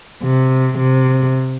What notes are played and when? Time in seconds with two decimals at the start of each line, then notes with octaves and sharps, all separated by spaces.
0.23 C3
0.78 C3